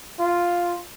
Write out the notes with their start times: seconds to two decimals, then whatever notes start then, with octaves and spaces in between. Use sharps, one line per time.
0.19 F4